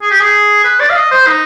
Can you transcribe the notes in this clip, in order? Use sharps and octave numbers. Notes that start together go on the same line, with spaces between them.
G#4
G4
G#4
B4
D5
F5
D#5
C5
D#4